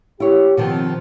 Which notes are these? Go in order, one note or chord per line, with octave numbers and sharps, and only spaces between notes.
E4 G4 C#5
B2 D#3 F3 C4